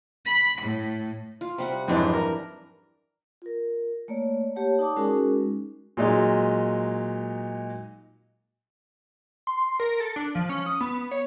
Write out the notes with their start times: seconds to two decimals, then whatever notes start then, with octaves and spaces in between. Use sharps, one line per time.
0.24 B5
0.61 A2
1.41 F4
1.58 C3 G3 F#5
1.88 F2 G#2 E3 F#3 D4
2.13 A#4
3.42 F4 A#4
4.08 A3 A#3 C#5 D5
4.56 A#3 G4 C#5 F#5 A5
4.79 D#4 D5 A5 D6 D#6
4.97 G#3 C#4 D#4 F#4 G#4 A#4
5.97 A#2 F#3 G#3 D#4
9.47 C6
9.61 C6
9.80 A#4
10.00 A4
10.16 D4
10.35 F3
10.50 C#4
10.66 D#6
10.81 B3
11.11 C#5